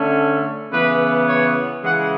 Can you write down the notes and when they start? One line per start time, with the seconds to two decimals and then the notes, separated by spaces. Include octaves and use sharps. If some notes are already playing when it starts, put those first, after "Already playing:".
Already playing: D3 A3 C#4
0.70 C#3 E3 B3 B4
1.27 C#5
1.83 C#3 E3 G#3 F#5